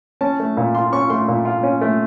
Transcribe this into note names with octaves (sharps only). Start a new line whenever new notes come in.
C#4 A5
A3
A#2
F4 C6
C#4 C#6
A3 C6
A#2
F4
C#4
A3